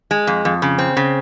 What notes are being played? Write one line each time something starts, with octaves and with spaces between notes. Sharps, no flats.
G#3
F2
F2
C#3
C4
C#3